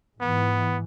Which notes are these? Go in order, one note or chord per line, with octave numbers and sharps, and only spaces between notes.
G#2 E3 B3